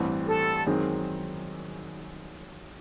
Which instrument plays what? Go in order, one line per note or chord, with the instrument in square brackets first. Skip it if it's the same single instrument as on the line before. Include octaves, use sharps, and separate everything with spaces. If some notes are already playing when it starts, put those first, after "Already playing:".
Already playing: [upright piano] A1 G2 E3 G3 C4
[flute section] A4
[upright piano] F#2 D#3 G#3 C4